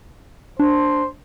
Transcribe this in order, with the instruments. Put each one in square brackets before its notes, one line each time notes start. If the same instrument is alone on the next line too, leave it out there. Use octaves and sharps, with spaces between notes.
[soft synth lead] D4 [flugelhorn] C5